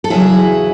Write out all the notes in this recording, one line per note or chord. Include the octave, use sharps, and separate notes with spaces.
A4
E2 C#3 F#3 E4 G#4